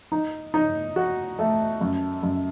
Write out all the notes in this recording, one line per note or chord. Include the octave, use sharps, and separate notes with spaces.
D#4
D#4
F#4
A3
F#2
F#2